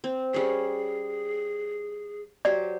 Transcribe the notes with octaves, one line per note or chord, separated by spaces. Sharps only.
C4
G3 C#4 G#4
F#3 G4 C5 D5